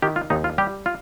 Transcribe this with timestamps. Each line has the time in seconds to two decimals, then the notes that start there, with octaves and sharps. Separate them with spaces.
0.02 D#3 G4
0.16 F4
0.30 D#2 D#4
0.44 F4
0.58 G3 G4
0.86 F4